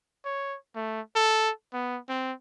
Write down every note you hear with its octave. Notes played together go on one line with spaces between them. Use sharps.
C#5
A3
A4
B3
C4